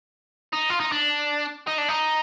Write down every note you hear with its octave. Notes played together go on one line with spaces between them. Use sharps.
D#4
F4
D#4
D4
D#4
D4
D#4